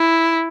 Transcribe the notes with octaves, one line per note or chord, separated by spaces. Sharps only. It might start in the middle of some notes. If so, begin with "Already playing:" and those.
Already playing: E4